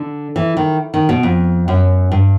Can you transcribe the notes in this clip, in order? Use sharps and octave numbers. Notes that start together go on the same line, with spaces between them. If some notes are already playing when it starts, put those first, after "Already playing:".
Already playing: D3
E3
D#3
D#3
B2
F2
F#2
G2